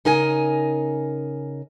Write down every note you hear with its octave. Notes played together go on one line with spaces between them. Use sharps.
C#3 D#4 A#4 G#5